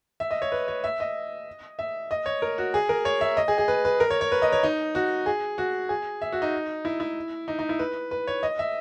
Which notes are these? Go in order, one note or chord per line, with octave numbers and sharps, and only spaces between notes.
E5
D#5
C#5
B4
C#5
E5
D#5
E5
D#5
C#5
A#4
F#4
G#4
A#4
C#5
E5
D#5
G#4
G#4
B4
B4
A#4
C#5
C#5
B4
D#5
C#5
D#4
F#4
G#4
F#4
G#4
E5
F#4
D#4
E4
E4
D#4
D#4
E4
B4
B4
C#5
D#5
E5